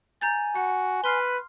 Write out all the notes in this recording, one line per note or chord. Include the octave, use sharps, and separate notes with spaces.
G#5 A#5 G6 A6
F#4 F#5
B4 C6 F6 C7